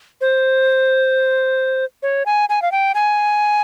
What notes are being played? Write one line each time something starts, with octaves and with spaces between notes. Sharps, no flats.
C5
C#5
G#5
G#5
F5
G5
G#5